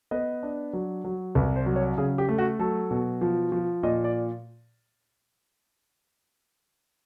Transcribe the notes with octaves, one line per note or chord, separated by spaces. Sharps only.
B3 D#5
D4
F#3
F#3
C2 B4
C5
F#3
C#5
C#3 G#4
G4
A3
F#4
F#3 A4
B2
F3
F3
A#2 D#5
D5